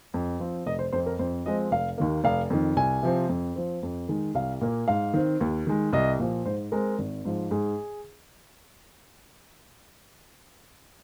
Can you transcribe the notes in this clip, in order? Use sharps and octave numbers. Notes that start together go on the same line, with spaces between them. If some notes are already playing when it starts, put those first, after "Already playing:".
F2
F3 C4
F1 D#5
C5
F2 F3 C4 C5
A#4
F2 C5
F3 G#3 C4 D#5
F1 F5
D#2 D#3 A#3
F1 F5
F2 D#3
C2 G#5
C3 F3 C4
F2
F3 C4
F2
D#3 G#3
C2 F5
A#2 A#3
G#2 F5
D#3 C4
D#2
D#3 G#3
C2 D#5
A#2 F3
G#2 C5
G#3 C4 A#4
G#1
G#2 F3
G#2 G#4